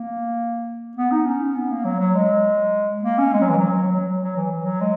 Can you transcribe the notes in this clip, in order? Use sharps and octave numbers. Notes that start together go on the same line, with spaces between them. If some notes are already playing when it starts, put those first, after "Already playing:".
Already playing: A#3
B3
D#4
C#4
B3
A#3
F#3
F#3
G#3
A#3
C#4
G#3
F#3
E3
F#3
F#3
F#3
E3
E3
F#3
G#3